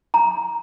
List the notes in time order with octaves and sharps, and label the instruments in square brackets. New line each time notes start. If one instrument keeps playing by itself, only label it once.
[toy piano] A#5